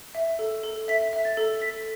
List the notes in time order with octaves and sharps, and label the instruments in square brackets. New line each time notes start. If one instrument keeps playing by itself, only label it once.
[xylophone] E5
A4
A4
E5 B6
E5
A6
A4
A4 B6